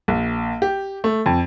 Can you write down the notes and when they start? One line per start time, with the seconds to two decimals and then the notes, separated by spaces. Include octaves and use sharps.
0.08 A#1
0.62 G4
1.04 A3
1.26 F2